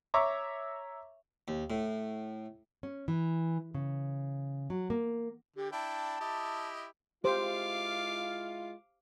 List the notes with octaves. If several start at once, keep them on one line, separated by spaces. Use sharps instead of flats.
C#5 E5 A#5 C#6 D6
D#2
A2
C#4
E3
C#3
F#3
A#3
D3 G4
D4 E4 G5 A5
E4 G4 D#5
G#3 E4 F4 G4 C5 F5 D6